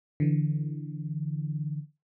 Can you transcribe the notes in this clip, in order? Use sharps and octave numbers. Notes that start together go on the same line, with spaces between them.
D3 E3